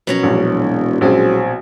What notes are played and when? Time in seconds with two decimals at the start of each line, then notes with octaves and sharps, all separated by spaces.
0.07 B2 F3 F#3 C#4 C#5 A#5
0.23 E1 A#1
1.01 A#1 F#3 G#3 C4 C#4 E4 G#4